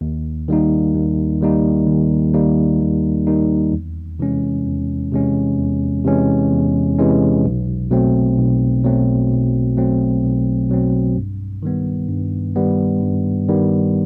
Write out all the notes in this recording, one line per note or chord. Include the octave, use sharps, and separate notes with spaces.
D#2
D#3 G3 A#3 D#4
D#2
D#3 G3 A#3 D#4
D#2
D#3 G3 A#3 D#4
D#2
D#3 G3 A#3 D#4
E2
C3 E3 G#3 C#4
E2
C3 E3 G#3 C#4
E2
C3 E3 G#3 C#4
E2
C3 E3 G#3 C#4
B1
B2 F#3 A3 C4
B1
B2 F#3 A3 C4
B1
B2 F#3 A3 C4
B1
B2 F#3 A3 C4
G2
D#3 G3 B3
G2
D#3 G3 B3
G2
D#3 G3 B3